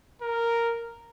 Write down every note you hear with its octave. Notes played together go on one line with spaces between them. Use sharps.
A#4